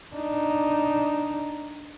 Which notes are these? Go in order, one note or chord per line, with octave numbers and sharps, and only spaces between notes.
D4 D#4